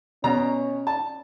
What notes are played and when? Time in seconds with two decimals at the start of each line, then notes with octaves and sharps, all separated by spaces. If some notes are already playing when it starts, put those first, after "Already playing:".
0.24 B2 C#4 A#5
0.87 A5